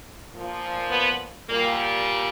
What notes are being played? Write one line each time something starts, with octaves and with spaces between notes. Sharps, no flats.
A#2 F3
B3
A#2 G3 A#3